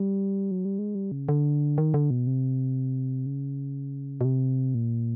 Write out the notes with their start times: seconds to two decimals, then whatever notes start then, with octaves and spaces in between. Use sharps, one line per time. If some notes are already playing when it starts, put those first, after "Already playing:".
Already playing: G3
0.51 F#3
0.65 G3
0.79 G#3
0.95 G3
1.12 C#3
1.29 D3
1.78 D#3
1.94 D3
2.10 B2
2.27 C3
3.26 C#3
4.21 B2
4.25 C3
4.75 A#2